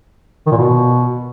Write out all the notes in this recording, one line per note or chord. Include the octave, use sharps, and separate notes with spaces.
D#3
A#2
B2